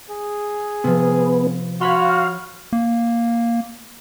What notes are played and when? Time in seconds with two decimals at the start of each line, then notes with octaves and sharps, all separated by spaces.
0.10 G#4
0.84 C3 F3 B3
1.81 F#4 C#5 F5 B5 C6
2.73 A#3